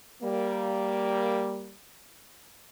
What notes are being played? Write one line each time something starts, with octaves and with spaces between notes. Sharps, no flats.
G3 A#3